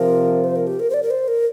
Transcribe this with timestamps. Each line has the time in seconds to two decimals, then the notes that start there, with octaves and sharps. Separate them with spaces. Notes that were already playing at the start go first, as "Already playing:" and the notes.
Already playing: C3 F3 A#4
0.44 C5
0.56 A#4
0.67 G4
0.80 A#4
0.90 C5
0.94 D5
1.03 A#4
1.11 C5
1.28 A#4